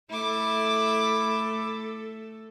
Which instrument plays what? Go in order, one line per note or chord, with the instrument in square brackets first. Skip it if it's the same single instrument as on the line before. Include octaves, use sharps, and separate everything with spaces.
[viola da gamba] A3 A4 [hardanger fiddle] E4 D6